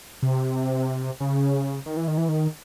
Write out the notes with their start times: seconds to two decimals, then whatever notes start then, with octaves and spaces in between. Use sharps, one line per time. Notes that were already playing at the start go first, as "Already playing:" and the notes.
0.22 C3
1.20 C#3
1.86 D#3
1.97 E3
2.08 D#3
2.18 E3
2.29 D#3